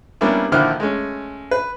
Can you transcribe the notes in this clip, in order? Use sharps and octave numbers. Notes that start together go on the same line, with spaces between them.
G3 A#3 B3 C#4 D4 E4
A#1 D3 D#3 E4 C5 F6
G#3 A3 C#4
B4